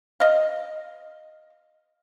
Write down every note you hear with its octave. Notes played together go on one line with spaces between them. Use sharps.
D#5 F5